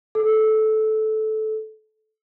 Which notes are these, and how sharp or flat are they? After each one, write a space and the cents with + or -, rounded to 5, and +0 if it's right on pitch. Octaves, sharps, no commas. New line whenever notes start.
A4 -15